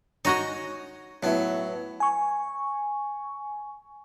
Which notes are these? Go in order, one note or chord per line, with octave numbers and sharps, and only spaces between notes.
D#4 F#4 C#5 D#5 G#5 A#5
A2 F#3 B3 E4
G#5 C#6